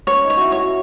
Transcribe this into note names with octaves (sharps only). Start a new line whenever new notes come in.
C#4 C#5
D#4
C#5
E4 F#4
C#5
F#4